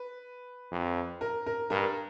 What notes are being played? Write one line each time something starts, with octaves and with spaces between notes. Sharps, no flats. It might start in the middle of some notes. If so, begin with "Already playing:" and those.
Already playing: B4
F2
A#4
A#4
G2 A#4